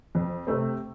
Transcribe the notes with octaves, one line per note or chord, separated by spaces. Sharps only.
F2
C3 A3 C4